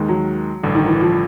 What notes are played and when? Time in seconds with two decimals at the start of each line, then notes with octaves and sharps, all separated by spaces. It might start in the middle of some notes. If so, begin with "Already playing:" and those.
Already playing: D#2 D#3 G#3
0.08 F#3
0.63 A1 G2 D3
0.75 D#3
0.88 E3
1.01 F3